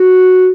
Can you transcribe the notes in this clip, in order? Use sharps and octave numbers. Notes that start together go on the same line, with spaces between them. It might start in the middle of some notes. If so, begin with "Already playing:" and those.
Already playing: F#4